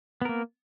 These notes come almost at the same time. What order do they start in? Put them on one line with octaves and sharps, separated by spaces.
B3 A#4 A#3